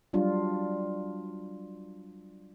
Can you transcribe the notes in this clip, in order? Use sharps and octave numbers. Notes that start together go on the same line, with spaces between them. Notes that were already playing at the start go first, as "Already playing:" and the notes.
F#3 G3 D4 F4